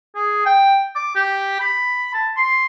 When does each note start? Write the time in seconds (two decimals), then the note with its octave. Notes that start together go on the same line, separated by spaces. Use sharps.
0.16 G#4
0.46 G5
0.96 D6
1.16 G4
1.60 B5
2.14 A5
2.37 C6